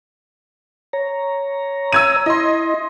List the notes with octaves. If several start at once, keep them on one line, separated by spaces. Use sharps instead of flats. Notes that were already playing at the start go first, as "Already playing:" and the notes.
C#5 A#5
E6 G#6 D#7
E4 D#5 C6